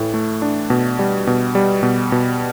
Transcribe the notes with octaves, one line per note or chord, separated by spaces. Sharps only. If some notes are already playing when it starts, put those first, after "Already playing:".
Already playing: A2 E3 A3
A3
D4
B2
G3
B2
G3
B2
B2